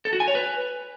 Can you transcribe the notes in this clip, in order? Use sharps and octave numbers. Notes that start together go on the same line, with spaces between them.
A4
F#4
G#5
C#5
B4